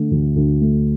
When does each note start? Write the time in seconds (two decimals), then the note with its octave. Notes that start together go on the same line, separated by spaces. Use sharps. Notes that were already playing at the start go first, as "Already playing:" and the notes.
Already playing: D3 A3
0.11 D2
0.36 D2
0.61 A3